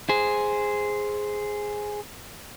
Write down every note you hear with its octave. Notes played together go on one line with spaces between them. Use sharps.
G#4 C5